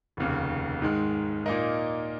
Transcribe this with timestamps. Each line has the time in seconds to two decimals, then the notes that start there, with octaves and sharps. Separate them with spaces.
0.17 F1 D#2 C#3
0.82 G#2 D#3 G#3
1.46 A#2 A#3 D#4 A#4 D#5